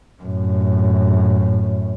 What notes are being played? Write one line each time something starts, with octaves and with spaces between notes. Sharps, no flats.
F#2 A2